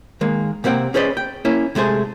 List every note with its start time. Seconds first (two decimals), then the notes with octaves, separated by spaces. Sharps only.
0.21 D#3 G#3 A#3
0.64 C3 A#3 C4 F#5 G5
0.94 C#4 G#4 B4 C5 D5 D#5
1.17 G5
1.45 A#3 C#4 E4
1.75 C3 G#3 A3 G#4 C5